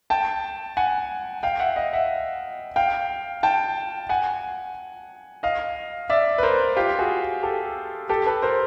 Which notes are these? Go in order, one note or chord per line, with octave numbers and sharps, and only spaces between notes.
G5 A5
F#5 G#5
F5 G5
E5 F#5
D#5 F5
E5 F#5
F5 G5
G5 A5
F#5 G#5
D#5 F5
D5 E5
B4
A#4 C5
F4 G4
F#4 G#4
G4 A4
G4 A4
A4 B4
A#4 C5